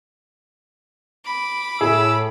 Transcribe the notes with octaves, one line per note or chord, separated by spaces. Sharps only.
B5 D6
A2 G#4 E6